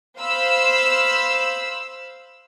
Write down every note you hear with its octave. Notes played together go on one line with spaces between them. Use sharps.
C5 F5 B5 E6